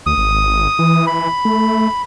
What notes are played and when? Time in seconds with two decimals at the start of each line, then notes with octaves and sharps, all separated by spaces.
0.06 D2 D#6
0.18 G#1
0.79 E3
1.07 B5
1.45 A3